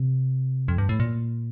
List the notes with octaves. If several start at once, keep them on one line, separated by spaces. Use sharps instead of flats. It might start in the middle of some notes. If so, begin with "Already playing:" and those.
Already playing: C3
F2
G2
A2
A#2